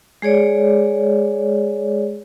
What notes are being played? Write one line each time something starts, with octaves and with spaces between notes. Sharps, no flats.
G#3 G#4 C#5 D5